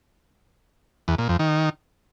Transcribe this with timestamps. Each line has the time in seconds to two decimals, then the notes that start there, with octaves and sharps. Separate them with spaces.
1.08 E2
1.18 A#2
1.29 F2
1.39 D#3